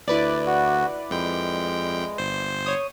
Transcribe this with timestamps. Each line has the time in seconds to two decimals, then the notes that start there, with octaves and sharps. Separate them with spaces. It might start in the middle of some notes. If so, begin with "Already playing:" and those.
0.08 D2 E4 B4 D5
0.46 F#4
1.10 F2 G#3 G5
2.18 G1 C5
2.66 C#5 D#6